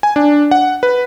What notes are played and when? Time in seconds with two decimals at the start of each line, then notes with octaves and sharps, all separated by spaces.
0.03 G#5
0.16 D4
0.51 F#5
0.83 B4